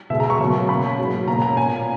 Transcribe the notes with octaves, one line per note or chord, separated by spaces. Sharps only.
B2 G#3 B3 E5
A#5
C#6
B2 F#3 A#3 C#4
B2 A#3 C#4 B5
G#2 F#3 A#3 C#4
B2 A#3 C#4 A#5
A#5
A#2 A#3 C#4 G#5